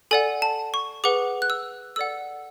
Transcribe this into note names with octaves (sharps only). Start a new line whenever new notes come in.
A4 D5 F#5 G#5
A5
C#6
G#4 B4 F#5 D6
F#6
E6
A4 D5 F#5 E6